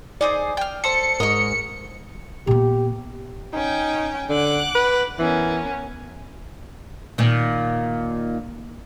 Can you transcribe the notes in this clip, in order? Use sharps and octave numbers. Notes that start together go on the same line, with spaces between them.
D#4 G#4 C5 D5
G5 F6
A4 C5 C#7
G#2 A#4 C#5 D#5
A#2 B3 G4
C#4 D#4 G5
D3 F#5 D6 F#6
B4
E3 B3 C#4 A#4
A#2 D#3